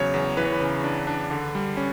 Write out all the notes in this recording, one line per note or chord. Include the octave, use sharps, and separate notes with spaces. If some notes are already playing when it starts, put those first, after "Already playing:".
Already playing: E2 C#3 F#3 C#5
E2
E3 B4
C#5
B4
C#3
D4
D4
D3
G3
C#4